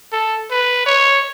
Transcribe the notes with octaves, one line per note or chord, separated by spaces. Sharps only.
A4
B4
C#5